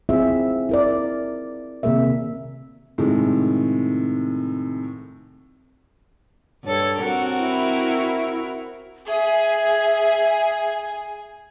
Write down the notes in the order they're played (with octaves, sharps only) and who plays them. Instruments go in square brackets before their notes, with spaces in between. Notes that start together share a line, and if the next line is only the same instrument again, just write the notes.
[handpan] C4 E4 F4 G#4 E5
E4 A#4 D5
C3 D#3 A#3 G#4 A#4 E5
[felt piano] A2 C3 D#3 G#3
[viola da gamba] G2 A4 [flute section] C#5
[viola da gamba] C4 F#4 A#4 [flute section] F#5
[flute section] E4
[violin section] G#4 [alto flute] E5